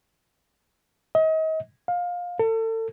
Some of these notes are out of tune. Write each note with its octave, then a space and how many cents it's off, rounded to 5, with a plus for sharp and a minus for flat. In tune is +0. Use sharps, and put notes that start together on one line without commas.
D#5 +35
F5 +20
A4 +35